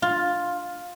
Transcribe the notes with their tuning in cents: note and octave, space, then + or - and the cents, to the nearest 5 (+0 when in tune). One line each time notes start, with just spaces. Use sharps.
F4 +10